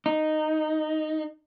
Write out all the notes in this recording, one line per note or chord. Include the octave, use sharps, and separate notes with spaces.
D#4